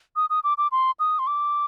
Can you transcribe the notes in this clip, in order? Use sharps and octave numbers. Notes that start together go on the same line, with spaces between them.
D#6
D#6
D6
D6
C6
D#6
C6
D6